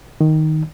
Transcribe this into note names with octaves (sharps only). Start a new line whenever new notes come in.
D#3